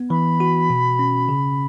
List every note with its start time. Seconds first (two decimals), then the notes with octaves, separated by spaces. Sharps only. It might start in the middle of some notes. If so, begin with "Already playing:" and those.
Already playing: B3
0.10 E3 B5
0.40 F#4
0.70 B2
0.99 C#4
1.29 C#3